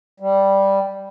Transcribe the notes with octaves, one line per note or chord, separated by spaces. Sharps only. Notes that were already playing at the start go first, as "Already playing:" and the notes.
G3